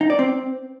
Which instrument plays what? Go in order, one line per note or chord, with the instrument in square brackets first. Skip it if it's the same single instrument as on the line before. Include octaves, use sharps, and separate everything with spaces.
[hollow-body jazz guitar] D#4
D5
C4